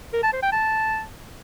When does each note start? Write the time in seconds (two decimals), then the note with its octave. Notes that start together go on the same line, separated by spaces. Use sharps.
0.13 A#4
0.23 A5
0.33 C5
0.42 G5
0.52 A5